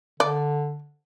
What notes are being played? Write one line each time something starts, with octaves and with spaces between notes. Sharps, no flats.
D3 D5